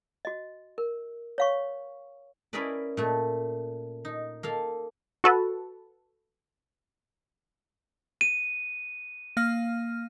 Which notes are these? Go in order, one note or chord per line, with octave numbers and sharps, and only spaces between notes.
F#4 D#5
A#4
C#5 F5 C#6
C#4 E4 G#4 A#4 B4 D5
A#2 A3
D#4
A#3 A4 F5
F#4 A4 B4
D#7
A#3 F5 F6